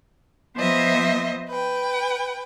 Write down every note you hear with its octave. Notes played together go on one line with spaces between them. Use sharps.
F3 B3 C5 D#5 E5
B4 G5